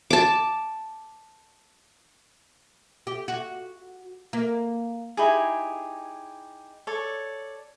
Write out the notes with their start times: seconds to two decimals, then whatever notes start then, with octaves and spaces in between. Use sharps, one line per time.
0.10 A5 D6
3.07 G4
3.28 F#4
4.33 A#3
5.17 D#4 E4 G4 G#4
6.87 A4 C#5 D5